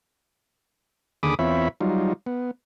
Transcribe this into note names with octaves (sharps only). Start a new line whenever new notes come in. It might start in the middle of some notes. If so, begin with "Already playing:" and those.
D#2 D3 G#4 B5 D6 D#6
E2 C4 F4 C#5 E5 B5
F#3 G3 D#4 F4
B3